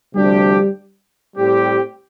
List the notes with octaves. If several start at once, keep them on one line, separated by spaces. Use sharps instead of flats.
D2 C3 F3 G3 D4 G4
A2 G3 C4 G4